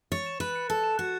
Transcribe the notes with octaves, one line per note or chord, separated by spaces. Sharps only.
C#5 A6
E7
B4 F#6
C#7
A4 A6
E7
F#4 F#6